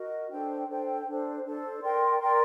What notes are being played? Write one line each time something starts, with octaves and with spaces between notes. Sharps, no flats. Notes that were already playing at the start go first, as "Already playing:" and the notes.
Already playing: F#4 A#4 D#5
D4 A4 C5 G5
D4 A4 C5 G5
D4 A4 C5
D4 A4 C5
A#4 D5 G5 C6
A#4 D5 G5 C6